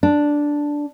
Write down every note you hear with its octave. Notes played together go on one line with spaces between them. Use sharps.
D4